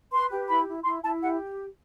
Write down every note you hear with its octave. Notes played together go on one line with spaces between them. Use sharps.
B4 C6
G4
E4 B5
E4
E4 C6
E4 A5
G4 F#5